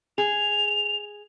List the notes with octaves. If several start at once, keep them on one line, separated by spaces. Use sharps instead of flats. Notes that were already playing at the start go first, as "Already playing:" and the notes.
G#4 F7